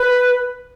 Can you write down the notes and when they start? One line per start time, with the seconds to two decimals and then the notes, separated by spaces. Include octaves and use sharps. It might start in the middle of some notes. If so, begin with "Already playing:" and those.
Already playing: B4